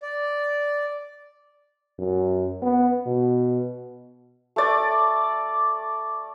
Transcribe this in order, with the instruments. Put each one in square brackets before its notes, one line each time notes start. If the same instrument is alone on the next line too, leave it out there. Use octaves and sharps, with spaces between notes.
[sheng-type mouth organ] D5
[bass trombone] F#2
B3
B2
[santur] A3 D5